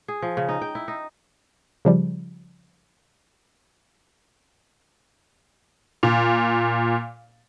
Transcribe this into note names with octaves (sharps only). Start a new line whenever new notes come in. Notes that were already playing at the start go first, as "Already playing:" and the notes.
G#4
F3
C#3
D#4
G5
E4
D#4
C#3 F3 G3
A#2